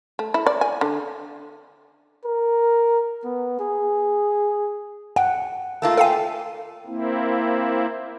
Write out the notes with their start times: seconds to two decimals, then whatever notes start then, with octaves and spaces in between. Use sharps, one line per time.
0.19 A3
0.34 E4
0.46 D5
0.61 G#5
0.81 D3
2.25 A#4
3.24 B3
3.59 G#4
5.16 F#5 G5
5.82 A3 A#3 F4 A5
5.97 A4 F5 G5 G#5
6.87 A#3 C4 E4